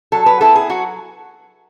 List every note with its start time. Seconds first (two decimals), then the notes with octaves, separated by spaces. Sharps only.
0.12 F#3 A4
0.26 B4
0.40 B3 E4 A4
0.55 G#4
0.69 F#3 F#4